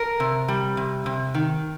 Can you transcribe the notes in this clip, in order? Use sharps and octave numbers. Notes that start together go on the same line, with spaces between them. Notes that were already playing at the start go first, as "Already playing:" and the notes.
Already playing: A#4
C3
G3
C3
C3
D#3